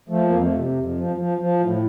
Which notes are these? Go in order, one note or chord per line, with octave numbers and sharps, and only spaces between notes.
F3 A3
A#3
F2
A3
C3
F2
F3
F3
F3
A2